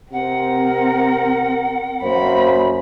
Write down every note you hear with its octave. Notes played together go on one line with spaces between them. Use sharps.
C3 C4 A#4 F#5
F#2 A#3 C5 B5